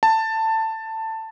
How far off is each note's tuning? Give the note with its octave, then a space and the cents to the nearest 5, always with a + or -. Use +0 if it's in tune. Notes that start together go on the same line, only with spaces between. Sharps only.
A5 +15